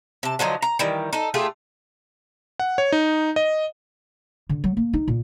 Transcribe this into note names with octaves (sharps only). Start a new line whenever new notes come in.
C3 A5
D3 F3 F#3 D#4
A#5
D#3 E3 G3
D#4 A4
A3 F4 G4 G#4
F#5
C#5
D#4
D#5
D3
F#3
A#3
D#4
A#2